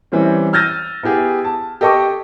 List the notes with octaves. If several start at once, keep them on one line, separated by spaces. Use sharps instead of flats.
E3 G3 C4 C#4
E6 F6 G6 A6 A#6 D#7
B3 E4 G4 G#4
A5
G4 A4 D#5 G5 C#6 D6